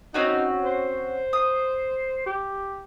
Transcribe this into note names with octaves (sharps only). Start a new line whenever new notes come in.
C4 C#4 D#4 F#4
C5
D#6
G4